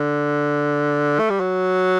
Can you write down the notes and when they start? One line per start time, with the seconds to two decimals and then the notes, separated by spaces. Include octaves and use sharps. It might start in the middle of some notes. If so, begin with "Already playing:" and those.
Already playing: D3
1.19 A3
1.30 G3
1.40 F#3